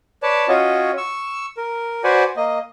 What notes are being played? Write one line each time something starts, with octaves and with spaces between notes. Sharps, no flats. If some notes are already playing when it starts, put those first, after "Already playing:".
B4 C#5 D5 A5
C#4 F4 F#4 C#5 D#5
C#6 E6
A#4
F#4 B4 C5 D5 F#5 G#5
A#3 D#5